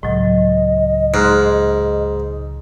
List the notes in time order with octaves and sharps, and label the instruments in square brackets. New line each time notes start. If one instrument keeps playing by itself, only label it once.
[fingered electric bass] C#2 [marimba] A2 F#3 [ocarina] D#5
[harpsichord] G#2 [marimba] C6 F6 F#6